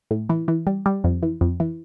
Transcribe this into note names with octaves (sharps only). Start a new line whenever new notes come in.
A2
E3
E3
G3
G3
F2
E3
F2
E3